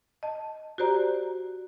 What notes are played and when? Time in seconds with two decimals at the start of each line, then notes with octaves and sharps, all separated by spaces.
0.23 D#5 A5
0.78 F#4 G4 C5 D5 A#5